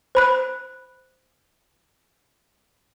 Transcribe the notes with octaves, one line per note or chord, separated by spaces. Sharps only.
C5 B5 F#6